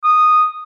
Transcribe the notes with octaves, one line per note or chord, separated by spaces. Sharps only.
D#6